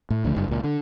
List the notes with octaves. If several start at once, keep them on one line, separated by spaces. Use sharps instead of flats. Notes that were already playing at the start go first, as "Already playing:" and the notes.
A2
C#2 D3 F3 A3
F#1 G2
C#2 A#2
D3